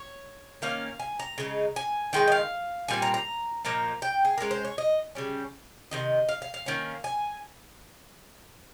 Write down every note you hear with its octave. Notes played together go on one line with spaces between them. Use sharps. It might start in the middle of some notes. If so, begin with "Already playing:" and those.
Already playing: C#5
D#3 A#3 C#4 F5
G#5
A#5
C#3 G#3 D#4
G#5
D#3 G#3 D#4 G5
D#5
F5
A#2 G3 C4 G#5
A#5
A#5
A#2 F3 A#3 D#4 A#5
G5
G#4
D#3 G#3 C#4 A#4
C5
C#5
D#5
C#3 G3 C#4
C3 D#3 D#5
F5
F5
F5
D#3 A#3 C#4
G#5